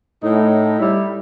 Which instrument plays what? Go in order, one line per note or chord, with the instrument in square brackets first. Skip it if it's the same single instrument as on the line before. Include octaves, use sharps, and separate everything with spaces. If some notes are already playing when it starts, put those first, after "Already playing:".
[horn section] A2 D#4
G3 E4